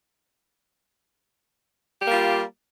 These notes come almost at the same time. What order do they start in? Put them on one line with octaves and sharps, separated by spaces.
G4 A#3 G3 F4